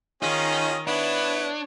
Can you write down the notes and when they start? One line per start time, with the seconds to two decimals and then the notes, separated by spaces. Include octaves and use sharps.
0.22 D#3 C#4 D#4 F4 G#4 D#5
0.87 B3 D4 E4 C#5